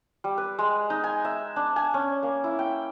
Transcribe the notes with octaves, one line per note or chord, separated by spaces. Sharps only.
G3
B4
G#3
D#4
G#5
E5
D4
G#5
C#4
A#3
E4
G5